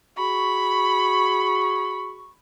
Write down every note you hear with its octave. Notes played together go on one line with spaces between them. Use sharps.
F#4 G#4 B5 C#6